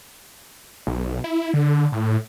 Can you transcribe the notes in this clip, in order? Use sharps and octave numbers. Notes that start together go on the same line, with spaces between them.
B1
E4
D3
A2